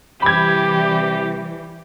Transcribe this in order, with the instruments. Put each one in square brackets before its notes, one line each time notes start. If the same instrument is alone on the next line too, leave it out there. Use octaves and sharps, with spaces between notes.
[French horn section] C3 G3 [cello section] E3 [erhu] G4 [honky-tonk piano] B5 G#6